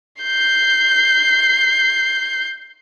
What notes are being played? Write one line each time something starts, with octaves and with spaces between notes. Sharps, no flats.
G6 C7